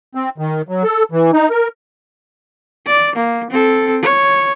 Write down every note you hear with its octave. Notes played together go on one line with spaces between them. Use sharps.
C4
D#3
F#3
A4
E3
D#4
A#4
D5
A#3
C4 A4
C#5